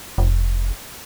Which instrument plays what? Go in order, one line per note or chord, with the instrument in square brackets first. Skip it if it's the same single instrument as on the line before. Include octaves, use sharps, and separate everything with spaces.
[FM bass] F1